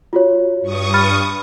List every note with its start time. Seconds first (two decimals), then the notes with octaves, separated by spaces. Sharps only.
0.13 F4 F#4 C#5
0.61 G2 C#6 D#6
0.94 B5 F6 A6